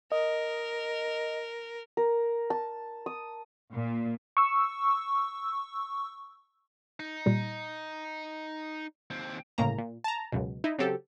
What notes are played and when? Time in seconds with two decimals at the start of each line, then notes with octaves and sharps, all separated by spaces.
0.12 A#4 D#5
1.97 A#4
2.50 A5
3.06 D#6
3.74 A#2
4.37 C#6 E6
7.00 D#4
7.26 A#2 G3
9.10 D#2 C4
9.58 G1 A2 C#3 A#3 A#5
9.78 A#2
10.04 A5 A#5
10.32 C#2 F#2 B2
10.64 D#4 E4
10.78 C#3 F#3 C4 G4 A4